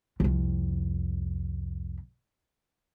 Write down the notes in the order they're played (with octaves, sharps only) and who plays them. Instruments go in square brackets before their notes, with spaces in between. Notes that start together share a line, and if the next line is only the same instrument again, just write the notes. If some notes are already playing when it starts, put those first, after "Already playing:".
[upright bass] C2 F2